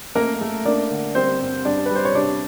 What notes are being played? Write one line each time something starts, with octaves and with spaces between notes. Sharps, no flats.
A3 A#3 A#4
A3
A#3 D4 D5
D3
G3 C4 C5
G2
G3 D4 D5
G3 B4
C5
C#5
C3 D4 D5